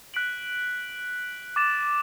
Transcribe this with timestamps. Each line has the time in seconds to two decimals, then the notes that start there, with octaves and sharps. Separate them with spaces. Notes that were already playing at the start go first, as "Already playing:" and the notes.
0.14 F#6 B6 D7 F#7
1.56 D6 A6 E7